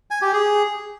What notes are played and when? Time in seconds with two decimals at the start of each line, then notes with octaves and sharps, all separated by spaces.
0.11 G#5
0.22 G4
0.33 G#4